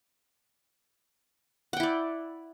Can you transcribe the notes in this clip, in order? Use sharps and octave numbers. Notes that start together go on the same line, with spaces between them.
E4 D5 F#5 G5